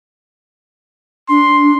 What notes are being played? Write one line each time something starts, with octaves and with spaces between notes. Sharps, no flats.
D4 C6